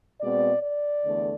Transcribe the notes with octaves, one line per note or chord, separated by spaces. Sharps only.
B2 G#3 C4 D5
D5
E2 D3 A3